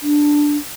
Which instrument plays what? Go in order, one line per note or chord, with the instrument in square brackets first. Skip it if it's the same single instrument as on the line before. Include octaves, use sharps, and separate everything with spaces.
[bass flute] D4